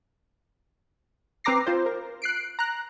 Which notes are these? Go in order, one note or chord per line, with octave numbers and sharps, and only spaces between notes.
C4 B4 A#5 D6 A#6 C7
F4 C5
A#4
F#6 C7 D7
A#5 F#6